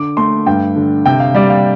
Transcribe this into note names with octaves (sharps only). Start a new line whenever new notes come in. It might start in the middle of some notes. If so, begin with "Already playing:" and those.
Already playing: D3 D6
A3 C6
G2 G5
D3
C3 G5
F5
G3 D5
F5